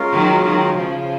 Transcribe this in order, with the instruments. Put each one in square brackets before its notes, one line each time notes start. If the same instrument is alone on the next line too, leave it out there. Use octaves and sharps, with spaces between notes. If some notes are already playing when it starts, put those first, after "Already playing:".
Already playing: [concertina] G#3 C#4 F4 A#4 F5
[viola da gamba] D#3 F#3
D#3 F#3
C#3 F3